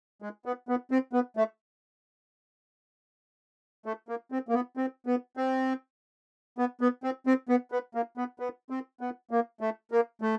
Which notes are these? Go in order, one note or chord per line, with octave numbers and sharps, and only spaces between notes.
G#3
B3
B3
C4
B3
A3
A3
A#3
C4
A#3
B3
C4
B3
C4
B3
B3
C4
C4
B3
B3
A#3
B3
B3
C4
B3
A#3
A3
A#3
A3